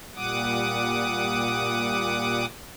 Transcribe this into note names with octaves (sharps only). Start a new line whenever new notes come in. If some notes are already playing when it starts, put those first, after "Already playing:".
A#2 G3 F#5 D6 D#6